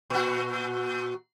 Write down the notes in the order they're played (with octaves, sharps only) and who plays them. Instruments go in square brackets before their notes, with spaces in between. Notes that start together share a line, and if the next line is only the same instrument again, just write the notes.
[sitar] A#2 F#4